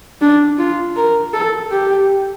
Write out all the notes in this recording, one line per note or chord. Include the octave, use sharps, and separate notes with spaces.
D4
F4
A#4
A4
G4